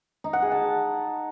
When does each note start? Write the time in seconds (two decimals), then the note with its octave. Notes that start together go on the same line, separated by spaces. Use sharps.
0.24 D#4
0.33 F#5
0.42 G#4
0.51 A5